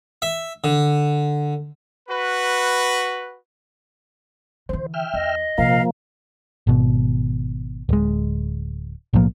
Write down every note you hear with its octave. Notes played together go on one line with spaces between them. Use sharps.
E5
D3
F#4 B4
D3 E3 C5
E5 G5 F6
E2 D#5
A#1 C3 F3 A#3 F5
G#1 B2
D1 G#3
B1 A2 F3 A#3